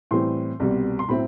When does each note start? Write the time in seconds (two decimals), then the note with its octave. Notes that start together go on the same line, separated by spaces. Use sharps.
0.11 A2 E3 G3 C4 C6
0.60 C2 B2 G3
0.99 C6
1.08 A2 F#3 C4 E4 B5